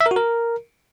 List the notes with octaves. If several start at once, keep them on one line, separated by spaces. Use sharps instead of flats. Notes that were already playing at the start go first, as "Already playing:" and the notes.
E5
A#4
F#4
A#4